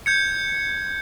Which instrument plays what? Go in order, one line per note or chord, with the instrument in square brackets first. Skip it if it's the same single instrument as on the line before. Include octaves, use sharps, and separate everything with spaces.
[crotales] G6 G#6 C#7